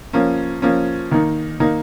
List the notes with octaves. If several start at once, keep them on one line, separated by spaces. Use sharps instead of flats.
F3 A#3 C#4
F3 A#3 C#4
D#3 A#3 D#4
D#3 A#3 D#4